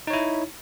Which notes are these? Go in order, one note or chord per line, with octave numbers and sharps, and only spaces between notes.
D#4 E4 C#5